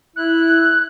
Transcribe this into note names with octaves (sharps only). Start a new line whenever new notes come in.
E4 F#6